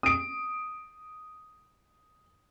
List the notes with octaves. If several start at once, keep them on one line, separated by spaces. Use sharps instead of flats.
D#6 D7